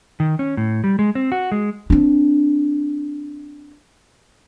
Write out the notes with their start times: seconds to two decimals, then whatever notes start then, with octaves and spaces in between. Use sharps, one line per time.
0.20 D#3
0.39 C#4
0.57 A2
0.84 G3
0.99 G#3
1.15 C4
1.32 F#4
1.52 G#3
1.90 C4 D4